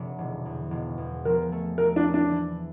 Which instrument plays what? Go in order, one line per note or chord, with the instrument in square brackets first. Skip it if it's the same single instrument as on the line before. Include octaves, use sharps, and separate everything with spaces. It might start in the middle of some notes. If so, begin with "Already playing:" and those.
Already playing: [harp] F1 D3
E1
E2
E1
E2
[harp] F3 [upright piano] A#4
[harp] A3
[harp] A3 [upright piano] A#4
[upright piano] D4
[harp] A3
[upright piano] D4
[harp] E3